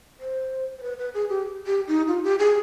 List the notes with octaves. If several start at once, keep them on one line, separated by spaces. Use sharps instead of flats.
C5
C5
B4
B4
G#4
G4
G4
D#4
F4
G4
G#4